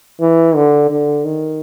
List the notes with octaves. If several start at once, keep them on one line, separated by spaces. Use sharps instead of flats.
E3
D3
D3
D#3